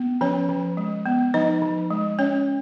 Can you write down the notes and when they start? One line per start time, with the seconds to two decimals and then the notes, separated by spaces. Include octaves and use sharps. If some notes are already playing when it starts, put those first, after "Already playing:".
Already playing: B3
0.21 F3 C#4 C#5
0.49 F3
0.77 G#3
1.06 B3
1.34 F3 D#4 D#5
1.62 F3
1.90 G#3
2.19 C#4 C#5